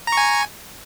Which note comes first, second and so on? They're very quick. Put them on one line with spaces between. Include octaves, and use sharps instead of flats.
A#5 C#6 G#5